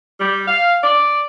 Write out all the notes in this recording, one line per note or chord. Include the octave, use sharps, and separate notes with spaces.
G3
F5
D5